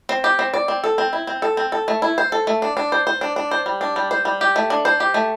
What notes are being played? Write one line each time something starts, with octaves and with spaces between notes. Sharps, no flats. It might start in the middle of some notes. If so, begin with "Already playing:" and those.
C4
G4
C4
D5
C4
A4
C4
E4
C4
A4
C4
A4
A3
E4
C5
A4
A3
D4
D4
C5
C5
D4
D4
C5
G3
D4
G3
C5
G3
G4
A3
D4
C5
G4
A3